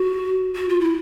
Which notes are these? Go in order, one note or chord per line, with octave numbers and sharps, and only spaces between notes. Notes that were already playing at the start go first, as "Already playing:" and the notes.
Already playing: F#4
F#4
F4
E4